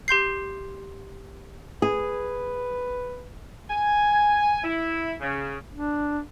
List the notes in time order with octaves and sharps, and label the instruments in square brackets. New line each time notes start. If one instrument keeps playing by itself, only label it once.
[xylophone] G4 C6 G6 C7
[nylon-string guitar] G#4 [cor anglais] B4
[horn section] G#5
E4
C#3
[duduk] D4